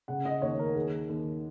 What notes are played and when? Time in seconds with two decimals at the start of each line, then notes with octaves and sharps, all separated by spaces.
0.08 C#3 F#5
0.25 D#5
0.42 D#2 C#5
0.59 A#4
0.75 D#2 G#4
1.09 D#2